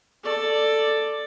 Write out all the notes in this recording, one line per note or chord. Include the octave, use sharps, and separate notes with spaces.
A4 D5